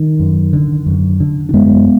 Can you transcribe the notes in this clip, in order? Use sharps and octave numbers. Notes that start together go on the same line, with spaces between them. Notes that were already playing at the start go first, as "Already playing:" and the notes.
Already playing: D#3
F#2
D3
F#2
D3
D4
F#2 G#3 B3